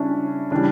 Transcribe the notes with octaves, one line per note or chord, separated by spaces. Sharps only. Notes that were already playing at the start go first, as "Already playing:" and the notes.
Already playing: C#3 G3 C#4 D4 E4
C#3 E3 G3 D4